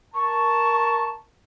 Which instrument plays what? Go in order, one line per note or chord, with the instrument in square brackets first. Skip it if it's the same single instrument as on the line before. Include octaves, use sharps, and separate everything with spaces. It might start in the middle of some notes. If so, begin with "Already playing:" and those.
[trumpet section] A#4 A5 [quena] C#6